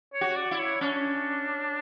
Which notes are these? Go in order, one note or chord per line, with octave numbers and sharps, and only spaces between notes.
C#5
F#4
D5
E4
C#5
C#4 D4